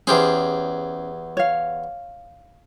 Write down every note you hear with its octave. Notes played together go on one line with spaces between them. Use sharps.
E2 C#4 G4 G#4 C5
C#5 F5